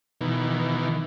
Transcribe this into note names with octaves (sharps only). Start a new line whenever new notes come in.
B2 D#3 E3